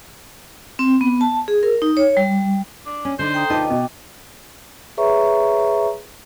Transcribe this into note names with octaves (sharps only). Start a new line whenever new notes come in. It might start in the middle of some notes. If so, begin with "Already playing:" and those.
C4
B3
A5
G#4
A#4
D#4
C#5
G3
D4
C#4
D3 D4 D#4 C5
G5 A#5 D#6
D2 D#4 F4 B4 D#5 G5 A5 D6
B2
G#4 B4 C#5 E5 A#5 C#6